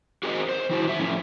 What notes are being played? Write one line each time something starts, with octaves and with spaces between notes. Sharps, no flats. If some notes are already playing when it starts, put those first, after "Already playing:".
F#4 G#4 A#4 C5 D#5
C5
D#3 E4 F#4
F#3 E5
A2 F3 C#4